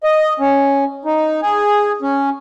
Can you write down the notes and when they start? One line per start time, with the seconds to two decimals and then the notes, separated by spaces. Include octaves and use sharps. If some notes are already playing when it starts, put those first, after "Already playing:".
0.03 D#5
0.40 C#4
1.05 D#4
1.42 G#4
2.02 C#4